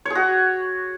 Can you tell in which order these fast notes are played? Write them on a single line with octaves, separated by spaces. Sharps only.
C#5 G#4 F#4